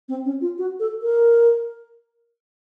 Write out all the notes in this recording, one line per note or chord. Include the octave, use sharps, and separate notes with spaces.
C4
C#4
F4
F#4
A4
A#4